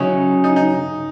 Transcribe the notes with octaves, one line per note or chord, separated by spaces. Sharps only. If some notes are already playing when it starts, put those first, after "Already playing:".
Already playing: C#3 F#3 C#4 D#4 E4
D#4
D#4